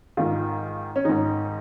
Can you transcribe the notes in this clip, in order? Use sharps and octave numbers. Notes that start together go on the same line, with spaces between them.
G#2 D#3 F4
C#4
G#2 D#3 D#4